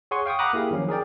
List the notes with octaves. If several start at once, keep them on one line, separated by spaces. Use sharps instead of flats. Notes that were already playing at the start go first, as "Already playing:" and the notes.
G#4 C#5 F#5 G#5 C6 C#6
F5 G5 C#6 D#6
F#5 A#5 B5 D6 D#6 F#6
A#3 E4 G4 G#4 F5
D#3 F3 F#3 C#4
G#4 A#4 D5 G5